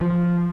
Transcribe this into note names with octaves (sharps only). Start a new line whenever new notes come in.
F3